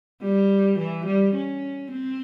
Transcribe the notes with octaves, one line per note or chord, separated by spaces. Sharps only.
G3
E3
G3
C#4
C4